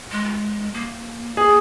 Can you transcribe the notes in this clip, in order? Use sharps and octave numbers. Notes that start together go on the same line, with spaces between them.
G#3
A#3
G#4